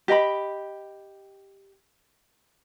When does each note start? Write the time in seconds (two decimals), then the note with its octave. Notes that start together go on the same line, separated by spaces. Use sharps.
0.08 G4 D#5 G5 B5